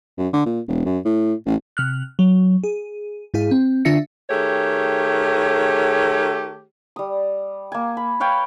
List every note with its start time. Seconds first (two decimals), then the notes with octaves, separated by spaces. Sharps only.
0.18 F#2
0.33 D3
0.46 A#2
0.68 E1
0.86 F#2
1.05 A2
1.46 A1
1.77 C3 F6 F#6
2.19 F#3
2.64 G#4
3.34 G#2 E4 G#4 F5
3.51 C4
3.85 D3 D4 F4 E5 A#6 C#7
4.30 D#3 A3 G4 G#4 C#5
6.96 G3 D#6
7.72 A#3 G#5
7.97 B5
8.20 B4 C#5 F5 G5